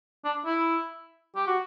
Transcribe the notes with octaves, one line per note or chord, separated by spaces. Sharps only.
D4
E4
G4
F#4